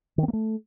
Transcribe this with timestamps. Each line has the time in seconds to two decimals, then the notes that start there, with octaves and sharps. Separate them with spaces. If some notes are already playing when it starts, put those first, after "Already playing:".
0.18 D#3
0.23 C4
0.28 A#3
0.33 A3